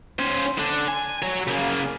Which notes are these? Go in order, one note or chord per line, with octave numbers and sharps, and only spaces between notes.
C#4 C5
D3 D4
G#5
F#3 C#5
C#3 A#3